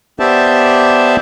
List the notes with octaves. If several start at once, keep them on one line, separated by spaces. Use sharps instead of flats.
B3 G4 C5 D5 E5 A5